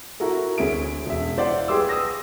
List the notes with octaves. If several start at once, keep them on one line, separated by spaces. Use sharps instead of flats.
E4 F#4 A4 A#4
D2 C#4 G#4 E5 D7
E1 E5
E4 C5 D5 F5 F#5
G4 G#4 B4 C6 D6 E6
D#6 E6 A#6